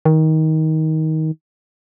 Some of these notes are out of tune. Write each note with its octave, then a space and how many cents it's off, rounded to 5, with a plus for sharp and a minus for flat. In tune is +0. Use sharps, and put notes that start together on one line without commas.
D#3 +20